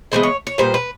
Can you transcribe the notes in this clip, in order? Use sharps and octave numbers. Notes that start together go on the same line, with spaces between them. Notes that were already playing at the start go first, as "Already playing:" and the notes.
C#3 E3 G#3 B3 C5
C#5
C#5
A#2 G3 B3 C5
B4